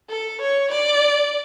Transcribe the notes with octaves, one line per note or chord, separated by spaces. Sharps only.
A4
C#5
D5